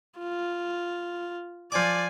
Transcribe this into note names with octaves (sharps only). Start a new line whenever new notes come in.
F4
F3 D5 G#5 D6